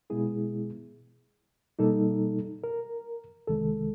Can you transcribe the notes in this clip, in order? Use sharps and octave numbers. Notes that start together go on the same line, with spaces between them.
B2 G#3 B3 E4 G#4
B2 G3 A#3 D#4 A4
A#4
C2 C3 D#3 G#3 A4